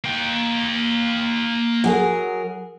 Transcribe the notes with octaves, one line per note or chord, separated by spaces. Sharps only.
A#3 G5
F#3 G#4 A#4